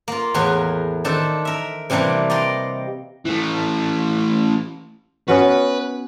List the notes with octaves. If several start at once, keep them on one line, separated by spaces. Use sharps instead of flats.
A#3 F4
E2 A2 G#4 A#4 B4 C6
D#3 D4 A4 C5
A#4 E5
C3 E3 G3 A#3 D4
D5 D#5 G5 A#5 C6
E3 A3
B3 C#4 F#4 B4